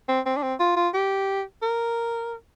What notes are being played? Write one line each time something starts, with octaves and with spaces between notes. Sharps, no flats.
C4
C4
D4
C4
F4
F4
G4
A#4